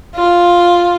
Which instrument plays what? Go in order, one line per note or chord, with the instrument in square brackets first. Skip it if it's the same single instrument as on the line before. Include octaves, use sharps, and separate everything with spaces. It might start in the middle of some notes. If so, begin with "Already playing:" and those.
[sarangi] F4